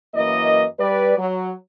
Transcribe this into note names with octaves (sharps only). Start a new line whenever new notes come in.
F#2 E3 A#3 E4 D#5
G3 B4 D5
F#3